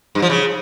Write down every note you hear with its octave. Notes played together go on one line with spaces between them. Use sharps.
G2
F3
C#3